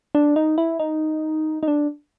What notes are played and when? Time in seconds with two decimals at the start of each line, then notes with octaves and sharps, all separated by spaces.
0.15 D4
0.36 D#4
0.58 E4
0.80 D#4
1.63 D#4
1.68 D4